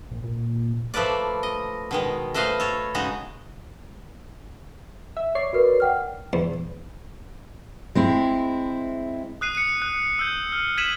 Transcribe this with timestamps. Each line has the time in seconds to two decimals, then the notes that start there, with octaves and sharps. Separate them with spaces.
0.11 A#1
0.24 A#2
0.94 F3 A3 A#3 B4 D5
1.43 D#5
1.91 B2 D#3 G#3
2.34 A3 B4 C5 D#5 F5
2.60 A4 C#5
2.95 C#3 G#3 D#4 F#4
5.17 E5
5.35 C#5 D5 C7
5.53 F#4 A#4 B4
5.80 F#5 G5 F6
6.33 E2
7.95 G#3 C4 E4
9.41 D#6 F#6 C7 D#7
9.55 C#7 D#7
9.82 F#6
10.19 E6 G6
10.52 F6
10.77 G#6 B6 D#7 E7 F#7